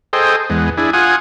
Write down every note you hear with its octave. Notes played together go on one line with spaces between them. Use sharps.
G#4 A4 C5 D#5 G5
E2 G#3 B3
D4 E4 G#4
F4 F#5 G#5 D#6